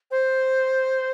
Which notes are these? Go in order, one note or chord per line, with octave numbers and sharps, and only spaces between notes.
C5